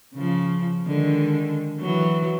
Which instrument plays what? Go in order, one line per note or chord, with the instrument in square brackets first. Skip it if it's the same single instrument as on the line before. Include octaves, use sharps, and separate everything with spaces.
[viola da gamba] C#3 F3
D3 D#3 G#3
E3 F#3